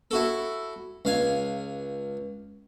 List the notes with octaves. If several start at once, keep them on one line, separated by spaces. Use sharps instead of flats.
E4 F#4 A4
C#2 F5 G#5